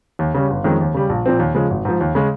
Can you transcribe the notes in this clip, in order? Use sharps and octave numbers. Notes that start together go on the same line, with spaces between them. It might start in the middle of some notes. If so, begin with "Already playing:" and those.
D#2
C#3 G3 C#4
G1
F2 D#3 G#3 C#4
D#2
C#3 G3
A#1
A#2 F3 C4
D#2
C#3 F3 G#3
G#1
G#2 F3
D#2
C#3 G#3